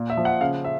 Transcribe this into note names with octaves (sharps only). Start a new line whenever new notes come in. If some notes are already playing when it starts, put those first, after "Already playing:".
Already playing: A#2
E5
F3
F#5
C#3 F5
E5